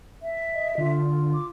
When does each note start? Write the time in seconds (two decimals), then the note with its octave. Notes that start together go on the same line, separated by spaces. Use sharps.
0.22 E5
0.54 D#5
0.78 D3 F4
1.34 D6